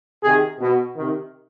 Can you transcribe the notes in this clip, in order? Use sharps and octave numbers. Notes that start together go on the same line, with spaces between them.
C3 D#3 G#4
B2
C3 D#3